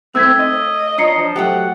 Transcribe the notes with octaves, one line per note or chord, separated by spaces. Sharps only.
A3 C4 E6 G#6 B6
D#5
D4 F4 C#5 A#5 D#6 C7 C#7
F3
F#3 A3 G4 F#5